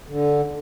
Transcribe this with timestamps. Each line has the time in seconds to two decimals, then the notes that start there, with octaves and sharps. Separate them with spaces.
0.08 D3